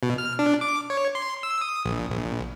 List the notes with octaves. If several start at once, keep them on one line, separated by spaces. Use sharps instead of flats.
B2
F6
D4
D6
C#5
C6
E6
D#6
A#1
A#1